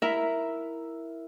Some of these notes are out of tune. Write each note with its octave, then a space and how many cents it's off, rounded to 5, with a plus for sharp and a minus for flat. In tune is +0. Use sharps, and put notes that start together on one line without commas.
E4 +0 A#4 +0 E5 +0